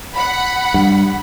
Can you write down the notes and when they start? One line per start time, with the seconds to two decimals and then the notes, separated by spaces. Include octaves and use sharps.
0.13 F#5 B5
0.74 G2